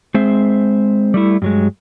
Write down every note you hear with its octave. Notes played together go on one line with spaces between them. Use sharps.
G#3 C4 C5 E5
G3 A3 E4
G2 F#3 G#3